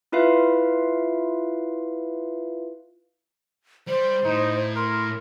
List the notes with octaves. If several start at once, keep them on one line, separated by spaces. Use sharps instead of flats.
E4 F4 B4 E5 F5
G3 C5
A2 D#4
A#4 C6